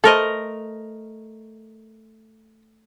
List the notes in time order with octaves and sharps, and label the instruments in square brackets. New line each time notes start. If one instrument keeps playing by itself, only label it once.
[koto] A3 A#4 D#5 [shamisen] A4 C5